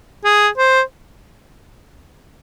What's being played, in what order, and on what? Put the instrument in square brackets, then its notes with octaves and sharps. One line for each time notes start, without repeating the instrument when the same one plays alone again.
[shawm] G#4
C5